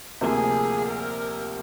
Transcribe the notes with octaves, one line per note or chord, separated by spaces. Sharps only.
D2 C3 F3 A#3 G#4
A#4